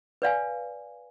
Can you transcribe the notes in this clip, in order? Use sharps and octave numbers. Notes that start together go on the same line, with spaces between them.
B4 D5 F5 G#5